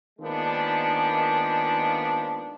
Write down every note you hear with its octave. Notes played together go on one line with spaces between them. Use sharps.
D#3 F3 G#3 A#3 B3 D4